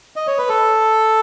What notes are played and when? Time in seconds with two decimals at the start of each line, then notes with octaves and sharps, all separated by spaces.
0.16 D#5
0.27 C#5
0.38 B4
0.49 A4